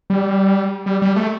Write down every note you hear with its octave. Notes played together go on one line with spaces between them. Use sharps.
G3
G3
G3
A3